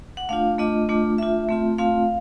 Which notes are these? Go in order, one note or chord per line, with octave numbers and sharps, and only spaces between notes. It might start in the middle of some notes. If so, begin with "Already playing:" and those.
F#5
A3 D4 F4 F5
A3 D4 F4 D#5
A3 D4 F4
A3 D4 F4 E5
A3 C4 F4
A3 C4 F4 F5